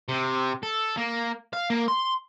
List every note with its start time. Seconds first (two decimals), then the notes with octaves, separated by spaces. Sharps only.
0.09 C3
0.63 A4
0.97 A#3
1.53 F5
1.70 A#3
1.88 C6